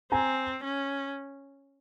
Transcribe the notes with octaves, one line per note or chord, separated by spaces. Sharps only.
C4 G#5 A#5
C#4